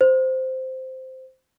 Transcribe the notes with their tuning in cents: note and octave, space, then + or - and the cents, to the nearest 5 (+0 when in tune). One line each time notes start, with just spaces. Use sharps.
C5 -10